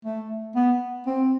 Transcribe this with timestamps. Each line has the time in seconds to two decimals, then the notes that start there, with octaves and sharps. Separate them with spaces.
0.05 A3
0.56 B3
1.06 C4